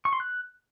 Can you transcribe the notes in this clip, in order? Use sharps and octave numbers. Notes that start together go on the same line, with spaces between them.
C#6
C6
F#6